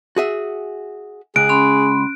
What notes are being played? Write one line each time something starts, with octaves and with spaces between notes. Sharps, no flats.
F#4 G#4 E5
C#2 G#4 F#6 D7
C#4 B5 C6